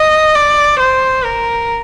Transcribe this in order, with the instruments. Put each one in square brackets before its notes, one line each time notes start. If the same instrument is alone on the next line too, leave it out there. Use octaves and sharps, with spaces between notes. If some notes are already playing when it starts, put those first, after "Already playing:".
Already playing: [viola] D#5
D5
C5
A#4